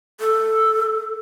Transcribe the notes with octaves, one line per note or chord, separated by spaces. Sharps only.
A4